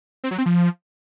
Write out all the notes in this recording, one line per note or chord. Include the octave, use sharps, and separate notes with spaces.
C4
F#3
C4
F3